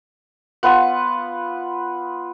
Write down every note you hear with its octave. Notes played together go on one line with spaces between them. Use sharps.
B3 F4 B4 F#5